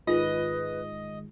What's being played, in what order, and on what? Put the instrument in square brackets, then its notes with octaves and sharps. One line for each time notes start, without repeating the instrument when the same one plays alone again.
[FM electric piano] G#2 D#3 G#3 [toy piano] F4 [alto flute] B4 [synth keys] D#5